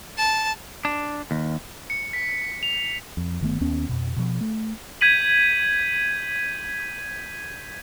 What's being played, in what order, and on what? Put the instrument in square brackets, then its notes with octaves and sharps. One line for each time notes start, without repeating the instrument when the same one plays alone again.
[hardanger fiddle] A5
[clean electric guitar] D4
D#2
[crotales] C#7
B6
F7
[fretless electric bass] F2
G1 D#3 A3 B3
D#2 B3 C#4
F2 B2
B2 F3
A3
[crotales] G6 G#6 B6 D#7 F#7